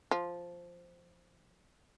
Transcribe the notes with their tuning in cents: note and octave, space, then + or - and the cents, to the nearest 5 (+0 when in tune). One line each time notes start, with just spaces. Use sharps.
F3 +0